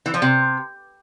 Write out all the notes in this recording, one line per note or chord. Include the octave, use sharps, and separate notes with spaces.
E3
F3
C3